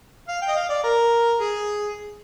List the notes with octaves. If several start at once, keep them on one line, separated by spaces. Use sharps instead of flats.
F5
G5
D#5
F5
D5
A#4
G#4